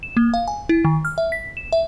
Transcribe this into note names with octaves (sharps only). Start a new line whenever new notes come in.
E7
A#3
F5
G#5
E4
D#3
F6
E5
B6
E7
E5